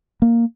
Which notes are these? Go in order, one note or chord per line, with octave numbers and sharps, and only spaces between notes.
A#3